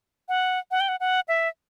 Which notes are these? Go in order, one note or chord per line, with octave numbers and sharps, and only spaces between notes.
F#5
F#5
G5
F#5
F#5
E5